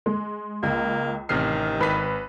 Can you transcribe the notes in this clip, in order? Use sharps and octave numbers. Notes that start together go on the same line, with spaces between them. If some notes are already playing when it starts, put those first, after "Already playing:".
G#3
C#2 A#3
A1 C3 D#3 F6 C7
G#1 B4 B6